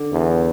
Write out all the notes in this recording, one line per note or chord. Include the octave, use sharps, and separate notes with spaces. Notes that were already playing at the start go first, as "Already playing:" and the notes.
Already playing: D3
E2